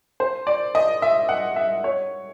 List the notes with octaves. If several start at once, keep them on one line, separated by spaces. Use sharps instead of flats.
C5
D5
D#5
E5
F#5
E5
C#5